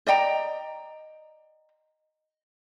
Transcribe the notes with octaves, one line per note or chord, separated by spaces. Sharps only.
D5 D#5 G5 A#5